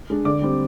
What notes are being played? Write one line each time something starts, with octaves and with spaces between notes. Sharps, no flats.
G#3 D4
D3 D5 D6
G3 C4